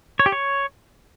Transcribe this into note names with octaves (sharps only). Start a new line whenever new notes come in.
C#5
G4
C#5